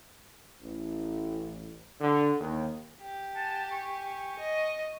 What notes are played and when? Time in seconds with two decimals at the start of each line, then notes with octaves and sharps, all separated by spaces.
0.62 A1
2.01 D3
2.40 D#2
3.01 G4
3.35 F#5 G#5 A5
3.71 G#5 C#6
4.38 D#5